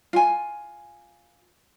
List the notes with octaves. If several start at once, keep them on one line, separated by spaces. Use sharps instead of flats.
F4 G#5